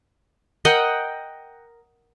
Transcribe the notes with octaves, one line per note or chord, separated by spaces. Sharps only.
A#4 D#5 F#5 G5